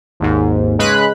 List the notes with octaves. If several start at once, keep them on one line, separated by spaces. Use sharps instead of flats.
G#1 D#2 G#2
C#3 G#3 B4 B5 F#6